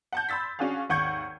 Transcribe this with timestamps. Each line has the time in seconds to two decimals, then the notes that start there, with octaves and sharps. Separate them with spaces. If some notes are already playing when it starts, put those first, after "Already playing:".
0.13 F#5 A5 G6
0.29 B5 C6 E6 A6 B6
0.59 C#4 D4 F#4 G#4 F5
0.89 G#1 D#2 F#5 C#6 G6 G#6